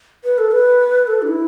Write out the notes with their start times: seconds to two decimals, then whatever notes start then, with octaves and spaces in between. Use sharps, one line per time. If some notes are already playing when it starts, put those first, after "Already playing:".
0.24 B4
0.38 A4
0.51 B4
1.07 A4
1.22 D4
1.27 E4